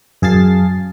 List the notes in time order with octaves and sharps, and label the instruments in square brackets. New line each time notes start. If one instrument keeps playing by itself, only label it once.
[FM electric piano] F#2 G#4 F5 A5 A6 C7